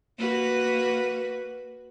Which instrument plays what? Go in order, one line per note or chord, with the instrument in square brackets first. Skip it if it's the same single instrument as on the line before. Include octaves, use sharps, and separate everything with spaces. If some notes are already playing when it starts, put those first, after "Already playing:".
[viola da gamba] A#3 F#4 B4